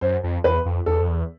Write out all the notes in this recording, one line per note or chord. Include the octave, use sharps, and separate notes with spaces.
F#2 C5
F2
E2 B4
F2
E2 A4
F2
E2